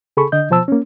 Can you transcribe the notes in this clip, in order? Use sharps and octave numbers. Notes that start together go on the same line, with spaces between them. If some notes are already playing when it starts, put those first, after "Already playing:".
C#3 G#4 A4 B5 C#6
D3 D#5 G6
B2 F3 C5 A5 E6
A#3 C#4